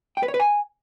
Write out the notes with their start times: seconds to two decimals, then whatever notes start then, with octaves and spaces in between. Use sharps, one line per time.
0.17 G5
0.23 B4
0.28 C#5
0.34 B4
0.40 G#5